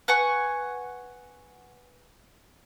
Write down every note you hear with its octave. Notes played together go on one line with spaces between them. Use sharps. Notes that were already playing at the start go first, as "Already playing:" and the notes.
B4 F#5 G#5 C#6